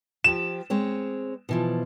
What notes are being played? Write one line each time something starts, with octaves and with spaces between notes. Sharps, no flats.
F3 G4 E7
G#3 C4 C#5
B2 E3 F3